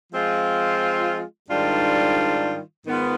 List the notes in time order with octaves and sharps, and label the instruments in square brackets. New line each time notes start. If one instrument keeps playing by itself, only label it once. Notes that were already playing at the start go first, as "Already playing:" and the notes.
[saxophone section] F3 G#3 C4 F4
G#2 D#3 G3 D4 F4
G#2 D#3 B3 F4